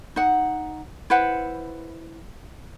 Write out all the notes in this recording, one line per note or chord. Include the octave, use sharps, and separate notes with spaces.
D#4 F#5
E4 B4 C5 F#5